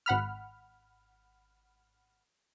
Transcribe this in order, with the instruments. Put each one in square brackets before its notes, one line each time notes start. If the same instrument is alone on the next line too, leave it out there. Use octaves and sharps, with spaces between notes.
[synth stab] G#1 F#5 B5 F6